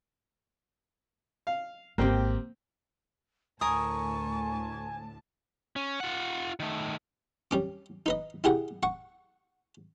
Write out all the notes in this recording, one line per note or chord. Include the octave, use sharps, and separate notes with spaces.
F5
G#1 D#3 A#3 C4 G4
D2 A2 A#4 G#5 A5 C#6 D#6
C#4
F4 F#5
D#3 A3
G3 C#4 D6
D#4 B4 D#5
E4 G4 G#4 F#5
F#5 C#6